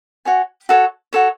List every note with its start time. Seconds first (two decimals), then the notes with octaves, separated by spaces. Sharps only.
0.25 F#4 C#5 G#5
0.69 F#4 A4 C#5
1.13 F#4 A4 C#5